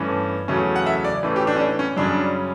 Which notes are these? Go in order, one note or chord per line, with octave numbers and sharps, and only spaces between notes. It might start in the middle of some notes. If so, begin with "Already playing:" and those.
Already playing: G2 E3 A3 C#4
E2 C#3 F#3 A3 C#4
F#5
E5
D5
A2 E3 A3 C#4
G4
D4
C#4
D4
C#4
F#2 C#3 G3 C#4 D4